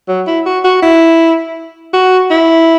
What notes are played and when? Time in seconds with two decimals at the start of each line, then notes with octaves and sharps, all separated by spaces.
0.08 F#3
0.27 E4
0.46 F#4
0.64 F#4
0.82 E4
1.93 F#4
2.30 E4